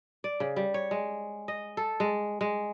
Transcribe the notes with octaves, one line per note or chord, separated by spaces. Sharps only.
D5
C#3
G3
C#5
G#3
D#5
A4
G#3
G#3